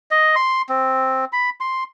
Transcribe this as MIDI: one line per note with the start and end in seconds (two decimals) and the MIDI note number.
0.11 0.35 75
0.36 0.62 84
0.69 1.25 60
1.32 1.50 83
1.60 1.84 84